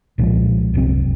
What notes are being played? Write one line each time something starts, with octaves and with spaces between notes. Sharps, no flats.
C2 A#2 F3 G#3
D1 C2 F#2 C4